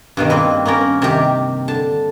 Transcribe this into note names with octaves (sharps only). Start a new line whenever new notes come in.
G2 B2 D#3
A#3 C4 B4
A#3 B3 C#4 A#4
C3 D#3 G4
D3 A5